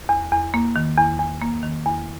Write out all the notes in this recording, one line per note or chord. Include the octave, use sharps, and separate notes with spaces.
E2
E2
A#3
D#3
E2
E2
A#3
D#3
E2